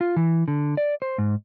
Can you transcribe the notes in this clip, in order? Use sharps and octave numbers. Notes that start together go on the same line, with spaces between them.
F4
E3
D3
D5
C5
G#2